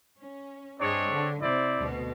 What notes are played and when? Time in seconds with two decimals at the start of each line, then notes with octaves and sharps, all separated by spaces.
0.18 C#4
0.80 G2 C4 D4 G#4 C#5 D#5
1.08 D3
1.42 C3 E4 C5 D5
1.78 D2 B2